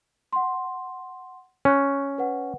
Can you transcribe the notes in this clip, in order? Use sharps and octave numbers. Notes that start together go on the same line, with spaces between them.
F#5 C6
C#4 C#6 F#6
B4 F#5